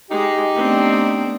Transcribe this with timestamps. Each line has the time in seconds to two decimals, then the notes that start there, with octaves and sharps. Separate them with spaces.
0.10 G#3 D#4 G4
0.56 A3 B3 C4 D4